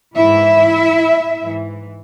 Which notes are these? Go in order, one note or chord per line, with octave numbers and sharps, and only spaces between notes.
G#2 E3 E4 E5
G#2 E3